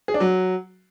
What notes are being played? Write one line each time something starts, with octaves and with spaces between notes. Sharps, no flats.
G#4
D4
F#3